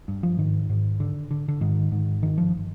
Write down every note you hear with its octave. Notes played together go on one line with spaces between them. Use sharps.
G2
F3
G#2 D#3
G#2
D3
D3
D3
G#2 D#3
G#2
G1 D#3
F3